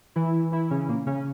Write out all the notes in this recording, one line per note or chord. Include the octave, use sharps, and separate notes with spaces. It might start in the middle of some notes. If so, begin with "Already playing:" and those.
E3 E4
E3 E4
C#3 C#4
A#2 A#3
C#3 C#4